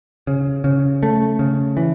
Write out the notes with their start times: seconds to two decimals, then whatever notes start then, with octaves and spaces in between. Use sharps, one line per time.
0.27 C#3
0.64 C#3
1.03 A3
1.39 C#3
1.77 E3